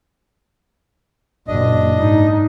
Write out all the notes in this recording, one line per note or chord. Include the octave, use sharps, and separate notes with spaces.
F#1 A#2 D4 D#5
G#2 D#4